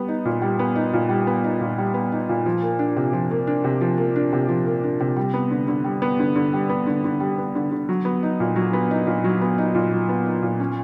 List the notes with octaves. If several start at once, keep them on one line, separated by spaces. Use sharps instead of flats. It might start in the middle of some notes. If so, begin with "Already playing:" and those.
Already playing: G3 B3
D#4
A#2
G3
B3
D#4
A#2
G3
B3
D#4
A#2
G3
B3
D#4
A#2
F3
A#3
D4
C3
F3
A#3
D4
C3
F3
A#3
D4
C3
F3
A#3
D4
C3
G3
B3
D3
D3
G3
B3
D3
D3
G3
B3
D3
D3
G3
B3
D3
D3
F#3
B3
D#4
A#2
F#3
B3
D#4
A#2
F#3
B3
D#4
A#2
F#3
B3
D#4
A#2
C#4